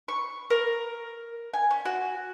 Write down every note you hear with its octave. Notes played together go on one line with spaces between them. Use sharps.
C#6
A#4
G#5
C#4
F#4